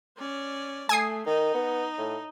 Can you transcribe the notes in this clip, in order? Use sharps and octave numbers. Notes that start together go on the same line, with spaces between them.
C#4 D5
A3 G#5 D#6 C7
D#3 D#4
B3
A2